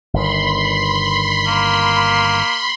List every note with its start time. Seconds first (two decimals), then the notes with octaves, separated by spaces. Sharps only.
0.14 G1 D#3 B5 C6
1.47 A#3